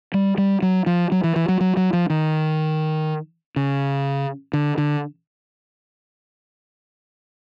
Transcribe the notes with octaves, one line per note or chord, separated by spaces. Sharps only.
G3
G3
F#3
F3
F#3
E3
E3
F#3
F#3
F#3
F3
D#3
C#3
D3
D3